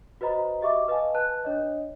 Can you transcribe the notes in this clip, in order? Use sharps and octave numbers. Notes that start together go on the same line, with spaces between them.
F#4 B4 C5 D#5 A#5 B5
F#4 G4 D#5 E5 C#6 D6
B4 D#5 F5 G#5 A5
B4 A5 F#6
D4 C#5 D#5